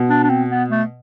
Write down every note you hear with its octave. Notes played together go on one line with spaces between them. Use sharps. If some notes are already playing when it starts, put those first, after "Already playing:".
Already playing: B2
D4
D4
C4
B3
A3